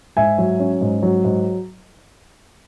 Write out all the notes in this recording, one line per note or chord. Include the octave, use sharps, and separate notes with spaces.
G#2 E5 G#5
F#3
C#4
G#2
F#3
G#2